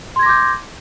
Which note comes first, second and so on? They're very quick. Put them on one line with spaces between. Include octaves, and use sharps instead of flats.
C6 G#6 A#6 D6 G6